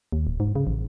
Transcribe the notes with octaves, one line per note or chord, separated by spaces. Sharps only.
D#2
D1
G#2
C#3
A1